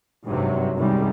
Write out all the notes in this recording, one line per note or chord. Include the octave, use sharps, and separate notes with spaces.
G#1 G2 C3 F#3
C2 F#2 C3 D#3 G3 G#3